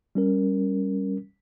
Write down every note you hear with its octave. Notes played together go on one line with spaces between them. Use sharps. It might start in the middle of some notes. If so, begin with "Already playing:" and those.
G3 C#4 A#4